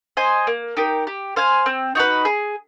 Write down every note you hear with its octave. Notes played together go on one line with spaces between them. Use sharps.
C5 D#5 G#5
A#3
D#4 G4 A#4
G4
C5 F5 G#5
C4
D#4 F#4 B4
G#4